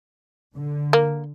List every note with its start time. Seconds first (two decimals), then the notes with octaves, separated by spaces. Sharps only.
0.56 D3
0.93 A#3